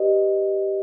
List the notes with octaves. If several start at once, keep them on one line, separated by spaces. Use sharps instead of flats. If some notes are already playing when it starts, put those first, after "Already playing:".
Already playing: G4 B4 D5 D#5